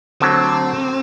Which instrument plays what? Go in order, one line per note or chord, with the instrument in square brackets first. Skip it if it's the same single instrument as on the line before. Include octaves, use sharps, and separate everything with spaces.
[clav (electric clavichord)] D3 F#3 A3 [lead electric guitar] C4